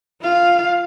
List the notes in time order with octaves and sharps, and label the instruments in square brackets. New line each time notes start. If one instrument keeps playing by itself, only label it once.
[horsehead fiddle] F4 F5